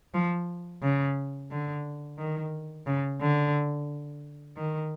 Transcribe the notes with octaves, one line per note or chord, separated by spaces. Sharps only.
F3
C#3
D3
D#3
C#3
D3
D#3